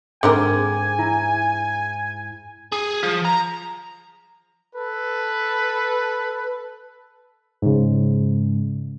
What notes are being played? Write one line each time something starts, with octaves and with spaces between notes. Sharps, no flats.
G#2 D3 C4 A#4 G5 G#5 D6
E4 A#5
G#4
F3
A#5
A4 B4
G#2 C#3